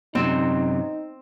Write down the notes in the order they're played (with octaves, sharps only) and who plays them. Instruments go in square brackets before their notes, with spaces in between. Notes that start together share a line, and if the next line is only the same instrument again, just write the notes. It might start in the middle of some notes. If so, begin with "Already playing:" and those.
[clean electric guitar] F#2 C3 F#3 [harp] C4 [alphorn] D#4